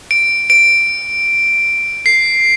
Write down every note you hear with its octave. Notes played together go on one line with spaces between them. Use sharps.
D7
D7
C7